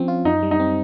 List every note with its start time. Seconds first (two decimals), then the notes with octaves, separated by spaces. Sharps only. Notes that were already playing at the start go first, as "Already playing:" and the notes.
Already playing: F3 C4 C#4
0.08 F4
0.25 F#2 D#4
0.43 G3
0.51 D#4
0.60 C4